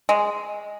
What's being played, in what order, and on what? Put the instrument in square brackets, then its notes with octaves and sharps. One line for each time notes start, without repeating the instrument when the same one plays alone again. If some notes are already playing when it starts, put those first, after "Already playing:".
[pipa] G#3